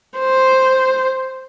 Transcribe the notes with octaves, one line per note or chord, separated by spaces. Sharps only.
C5